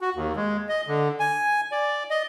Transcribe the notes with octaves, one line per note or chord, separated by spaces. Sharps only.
F#4
D#2
G#3
D#5
D3
G#5
D5
D#5